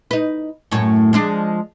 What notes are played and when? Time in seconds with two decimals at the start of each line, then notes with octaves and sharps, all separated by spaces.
0.11 D#4 B4
0.71 F#2 A2 C#5
1.13 F3 G#3 D4